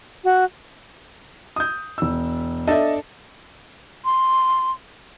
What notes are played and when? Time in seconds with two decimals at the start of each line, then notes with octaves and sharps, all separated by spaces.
0.24 F#4
1.56 D#6 G6
1.98 E1 E6
2.67 D4 A4 D#5 E5
4.05 C6